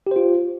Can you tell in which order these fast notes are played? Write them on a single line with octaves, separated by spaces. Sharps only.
G4 C5 F4